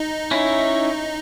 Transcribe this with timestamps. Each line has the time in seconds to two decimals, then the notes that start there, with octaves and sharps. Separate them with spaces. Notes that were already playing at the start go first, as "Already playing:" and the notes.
Already playing: D#4
0.31 C#4 E4